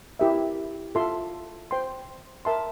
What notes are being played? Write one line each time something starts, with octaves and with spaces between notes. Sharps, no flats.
E4 G4 A#4 E5
F4 A4 E5 A5 C6
C5 G5 C6
A#4 E5 A5 C6